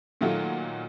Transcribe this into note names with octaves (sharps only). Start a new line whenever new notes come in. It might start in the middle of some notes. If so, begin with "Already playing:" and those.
A#2 D#3 F#3 A3 F4 F#4